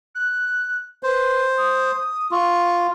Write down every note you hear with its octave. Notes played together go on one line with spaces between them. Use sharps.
F#6
B4 C5
D#6
F4 C#6